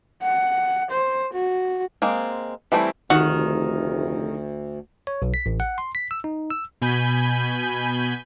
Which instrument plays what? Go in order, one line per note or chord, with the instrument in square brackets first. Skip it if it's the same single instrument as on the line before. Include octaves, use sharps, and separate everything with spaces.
[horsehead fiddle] F#5
C5
F#4
[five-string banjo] G#3 A#3 C4
E3 G3 A3 C4 E4
[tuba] F1 [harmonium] D2 [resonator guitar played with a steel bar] D#3 [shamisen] F#4
[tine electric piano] C#5
B1
B6
A1
F#5
C6
B6
E6
D#4
E6
[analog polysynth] B2 G#5 B5 G6 D#7